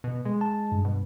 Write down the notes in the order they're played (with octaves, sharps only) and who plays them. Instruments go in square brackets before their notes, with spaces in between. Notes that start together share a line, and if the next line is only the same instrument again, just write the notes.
[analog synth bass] B2
G#3
[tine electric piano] A5
G2
[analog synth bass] B2